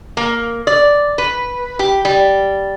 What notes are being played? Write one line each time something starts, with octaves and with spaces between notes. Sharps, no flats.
A#3
D5
B4
G4
G3